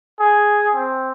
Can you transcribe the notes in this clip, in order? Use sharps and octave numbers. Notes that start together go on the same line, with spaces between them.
G#4
C4